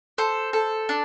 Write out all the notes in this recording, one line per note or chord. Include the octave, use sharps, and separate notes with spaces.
A4 C5
A4
D4